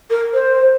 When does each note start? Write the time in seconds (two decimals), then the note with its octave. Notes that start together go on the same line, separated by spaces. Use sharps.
0.10 A#4
0.33 C5